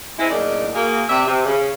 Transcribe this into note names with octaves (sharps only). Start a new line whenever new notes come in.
G#3 C4 E4
F#2 A2 C#3 A#3 D4 D#4
A#3 F#4 G#4
C3 D5 E5
C3
C#3